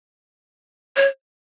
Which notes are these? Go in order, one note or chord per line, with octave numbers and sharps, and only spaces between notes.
C#5